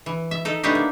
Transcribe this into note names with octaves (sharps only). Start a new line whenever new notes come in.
E3
E5
D#4 A4
A3 B3 D4 D#4 G4
A#3